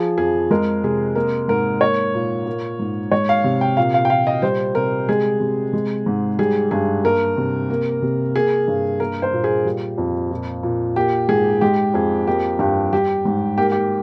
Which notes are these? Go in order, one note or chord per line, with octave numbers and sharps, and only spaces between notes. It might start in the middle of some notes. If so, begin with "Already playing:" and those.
Already playing: F3 G#4
F2 G#4
G#3 A#4
C3 G#4
A#3 A#4
G#2 A#4
A#3 C#5
A#2
A#3
G#2
G#3 C#5
F5
C3
G5
A#2 F5
F5
G5
A#2 F5
D#5
G3 C5
C3 A#4
G#3 G#4
C3
G#3
G#2
G3 G#4
G2 G#4
A#3 A#4
C3
A#3
C3
A#3 G#4
G2
A#3 A#4
C5
A#2
G#4
G3
F2
A#2
A#2
A#3 G4
G#2 G#4
G#3 G4
F2 G#4
A#3 G4
G2 G4
G3 G4
G#2
A#3 G4
G4